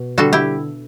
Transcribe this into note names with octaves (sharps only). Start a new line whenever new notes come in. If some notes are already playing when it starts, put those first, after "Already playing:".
Already playing: B2
D3 G3 F#4 A4
E4 G4